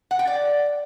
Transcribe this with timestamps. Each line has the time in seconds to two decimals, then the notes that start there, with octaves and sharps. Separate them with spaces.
0.11 F#5
0.19 G5
0.27 D5